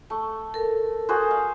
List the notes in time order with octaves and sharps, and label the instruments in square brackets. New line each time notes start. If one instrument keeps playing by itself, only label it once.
[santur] A3 [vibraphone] C#6
[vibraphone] A4 A#4
[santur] F#4 G#4 C5
F5